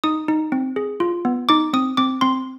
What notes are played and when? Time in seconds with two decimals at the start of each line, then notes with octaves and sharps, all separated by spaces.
0.04 D#4 D#6
0.28 D#4
0.52 C4
0.76 G#4
1.00 F4
1.25 B3
1.49 D#4 D6
1.73 C4 D#6
1.97 C4 D6
2.21 C4 C6